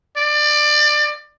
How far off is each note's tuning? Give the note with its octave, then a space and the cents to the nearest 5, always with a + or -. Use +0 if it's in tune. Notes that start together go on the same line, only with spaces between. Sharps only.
D5 +25